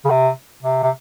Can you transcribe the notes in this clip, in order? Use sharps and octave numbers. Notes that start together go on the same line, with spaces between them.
C#3
C3
C3
C3